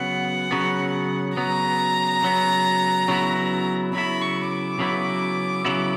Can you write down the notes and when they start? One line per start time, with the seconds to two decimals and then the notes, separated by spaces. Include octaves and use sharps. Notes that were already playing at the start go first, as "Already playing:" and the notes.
Already playing: C#3 F#3 B3 F#5
0.51 C#3 F#3 B3
1.36 C#3 F#3 B3 A#5
2.22 C#3 F#3 B3
3.08 C#3 F#3 B3 E4
3.93 C#3 F#3 B3 E4 B5
4.22 C#6
4.50 D6
4.79 C#3 F#3 B3 E4
5.65 C#3 F#3 B3 E4